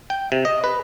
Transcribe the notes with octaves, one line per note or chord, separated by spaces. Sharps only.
G5
C3
D#5
B4